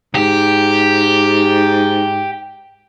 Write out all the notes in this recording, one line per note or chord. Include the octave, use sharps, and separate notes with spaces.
G#2 G4